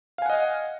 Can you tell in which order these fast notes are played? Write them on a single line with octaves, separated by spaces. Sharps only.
F5 G#5 F#5 D#5